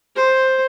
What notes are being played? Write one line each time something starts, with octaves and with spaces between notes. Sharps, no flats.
C5